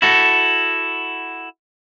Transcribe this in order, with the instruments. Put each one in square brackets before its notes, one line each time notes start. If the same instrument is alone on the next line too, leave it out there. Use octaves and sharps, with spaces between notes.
[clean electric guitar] E4 F#4 A4